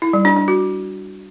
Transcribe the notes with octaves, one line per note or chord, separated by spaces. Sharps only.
E4
G3
D4
D4
F#4